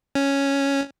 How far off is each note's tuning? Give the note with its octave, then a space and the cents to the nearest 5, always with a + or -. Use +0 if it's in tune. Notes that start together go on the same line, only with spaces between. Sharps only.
C#4 +0